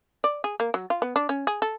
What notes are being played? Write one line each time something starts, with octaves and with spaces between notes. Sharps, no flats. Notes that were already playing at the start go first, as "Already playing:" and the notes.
D5
G#4
A#3
F#3
F4
B3
D4
C#4
G#4
A4